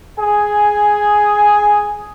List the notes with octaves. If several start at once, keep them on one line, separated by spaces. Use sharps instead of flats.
G#4 G#5